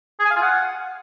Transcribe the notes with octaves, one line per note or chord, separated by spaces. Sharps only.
G#4
G#5
F5
F4
F#5